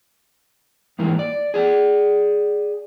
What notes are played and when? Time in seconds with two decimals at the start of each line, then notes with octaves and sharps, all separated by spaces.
0.99 G#2 E3 A#3
1.19 D5
1.54 G#4 D5